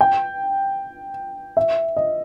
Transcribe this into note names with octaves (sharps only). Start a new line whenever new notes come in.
G5
E5
D#5